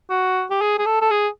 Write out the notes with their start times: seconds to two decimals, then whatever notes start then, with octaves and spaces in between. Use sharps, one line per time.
0.10 F#4
0.50 G4
0.61 G#4
0.78 G#4
0.86 A4
1.01 A4
1.11 G#4